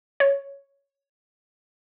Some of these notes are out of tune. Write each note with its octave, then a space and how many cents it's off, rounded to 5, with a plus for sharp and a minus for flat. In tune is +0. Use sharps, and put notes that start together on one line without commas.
C#5 +0